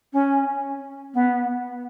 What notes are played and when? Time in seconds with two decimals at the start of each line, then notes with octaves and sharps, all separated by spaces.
0.13 C#4
1.14 B3